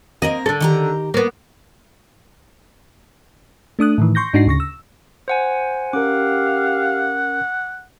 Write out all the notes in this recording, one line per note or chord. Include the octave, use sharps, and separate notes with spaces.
A#3 C4 A#4 D#5
D3 A4
D#3 G4 A#5
A#3 B3
A3 D4 D#6 F#6
A2 D#3 E3
C6 C#6 G6 A#6
G#2 D4 D#4 F#4 A#6 C7
D2 C#3 C#6 A#6
E6
C5 F#5 G#5
C#4 G4 A#4 F5 F#5 D6